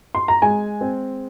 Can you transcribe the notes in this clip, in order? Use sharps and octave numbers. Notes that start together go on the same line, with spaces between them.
C6
A#5
G#3 G#5
C4